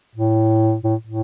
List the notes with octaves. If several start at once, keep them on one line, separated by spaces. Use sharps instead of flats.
A2
A2
A2